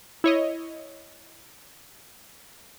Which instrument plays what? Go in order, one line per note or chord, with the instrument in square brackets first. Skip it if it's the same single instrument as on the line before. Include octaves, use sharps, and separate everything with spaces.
[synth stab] E4 C#5 D#5